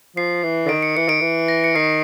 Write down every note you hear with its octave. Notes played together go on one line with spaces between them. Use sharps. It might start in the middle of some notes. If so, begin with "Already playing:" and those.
F3 C7
E3
D3
D#3 D7
C#7
E3 C#7
D#3 D7
E3
A#6
C#7
D#3 C7